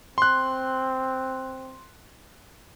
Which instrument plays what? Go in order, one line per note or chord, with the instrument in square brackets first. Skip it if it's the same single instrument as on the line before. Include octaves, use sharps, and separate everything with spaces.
[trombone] C4 [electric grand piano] C6 F#6